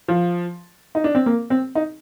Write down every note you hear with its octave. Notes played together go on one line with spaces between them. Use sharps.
F3
D#4
D4
C4
A#3
C4
D#4